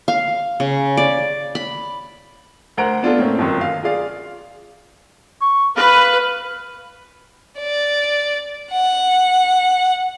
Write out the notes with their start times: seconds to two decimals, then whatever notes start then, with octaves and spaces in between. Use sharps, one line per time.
0.08 F5
0.60 C#3
0.97 D5
1.55 B5
2.77 D2 A#4 C5 F#5 A#5 D7
3.03 B3 D4 F4 A4
3.18 A2 A#3 C4 C#4
3.39 G1 F#2 D#3
3.61 F5
3.83 F4 G#4 D5 F5
5.41 C#6
5.77 B4 F5
7.59 D5
8.72 F#5